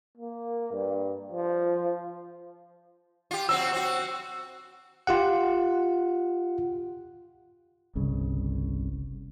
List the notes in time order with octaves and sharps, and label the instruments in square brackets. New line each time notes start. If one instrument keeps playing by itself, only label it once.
[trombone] A#3
G2
F3
[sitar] F4 G4
[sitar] F#3 C4 F#4 [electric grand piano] E6
[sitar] C4 F#4
[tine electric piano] F4 G4 F#5
[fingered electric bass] G1 C2 C#3